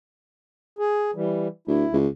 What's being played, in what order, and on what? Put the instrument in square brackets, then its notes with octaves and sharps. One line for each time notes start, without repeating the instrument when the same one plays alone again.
[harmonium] G#4
E3 G3
[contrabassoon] D2 [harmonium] E4
[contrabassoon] C#2